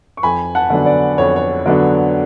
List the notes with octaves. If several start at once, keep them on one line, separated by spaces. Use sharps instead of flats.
C#6
F2 G#5 B5
F#5 A5
D3 F#3 B3 D4
D5
F2 C#5
C#5
D3 F#3 B3 D4